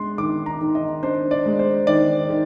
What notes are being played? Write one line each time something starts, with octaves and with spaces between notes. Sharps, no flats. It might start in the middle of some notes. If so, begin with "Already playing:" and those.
Already playing: G#3 D4 C6
D#3 D6
A#5
D#3
D#5
D4 C5
D5
G#3
C5
D#3 D5
D#3